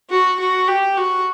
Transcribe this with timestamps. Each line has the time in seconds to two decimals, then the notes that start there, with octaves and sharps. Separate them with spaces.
0.10 F#4
0.39 F#4
0.68 G4
0.97 F#4